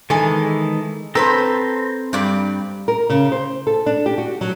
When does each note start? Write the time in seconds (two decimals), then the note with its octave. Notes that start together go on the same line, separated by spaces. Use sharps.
0.10 D#3 E3 G#3 A4 G#5
1.15 C4 A4 B4 C5 A#5 E6
2.13 G2 G3 D5
2.88 A#4
3.10 C#3
3.32 C5
3.67 A4
3.86 D4
4.06 G4
4.18 F#4
4.41 F#3